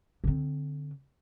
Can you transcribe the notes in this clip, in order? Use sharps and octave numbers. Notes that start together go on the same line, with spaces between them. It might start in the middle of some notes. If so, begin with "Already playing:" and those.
D3 C4